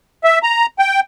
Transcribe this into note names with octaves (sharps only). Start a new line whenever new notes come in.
E5
A#5
G5